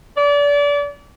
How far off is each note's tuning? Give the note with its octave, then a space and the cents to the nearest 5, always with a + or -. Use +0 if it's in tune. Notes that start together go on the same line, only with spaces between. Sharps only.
D5 -30